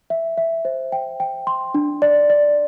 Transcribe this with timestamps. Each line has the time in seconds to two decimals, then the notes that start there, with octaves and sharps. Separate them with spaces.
0.10 E5
0.38 E5
0.65 C5
0.92 G5
1.20 G5
1.47 C6
1.74 D4
2.02 D5
2.30 D5